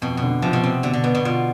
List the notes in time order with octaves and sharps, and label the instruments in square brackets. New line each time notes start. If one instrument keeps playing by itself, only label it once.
[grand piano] F2 [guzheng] B2
[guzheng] B2
[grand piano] D3
[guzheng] C3 [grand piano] F3
[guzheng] B2
[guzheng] C3 [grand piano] C4
[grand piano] B2 [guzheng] D3
[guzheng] D3
[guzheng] B2 [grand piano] B3
[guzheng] B2
[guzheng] B2 [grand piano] F4